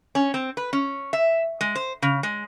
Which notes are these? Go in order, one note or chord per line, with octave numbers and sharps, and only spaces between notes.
C#4
C4
B4
C#4
E5
G#3
C5
C#3
G#3